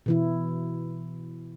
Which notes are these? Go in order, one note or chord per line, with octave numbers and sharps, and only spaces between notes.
B2 E3 E4